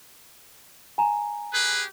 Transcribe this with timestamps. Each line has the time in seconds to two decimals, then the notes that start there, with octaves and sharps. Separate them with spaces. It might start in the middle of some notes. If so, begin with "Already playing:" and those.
0.98 G#5 A#5
1.54 G4 G#4 B4